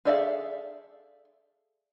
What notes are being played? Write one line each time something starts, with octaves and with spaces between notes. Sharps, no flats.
G#4 A4 D5 E5 F5